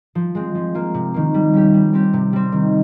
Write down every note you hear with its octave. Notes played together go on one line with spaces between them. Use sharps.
F3
G#3 C4
F3
A#3 F4
C3
D#3 A#3
G3
C#4 G4
G3
C4 G4
C3
G3 C4
D#3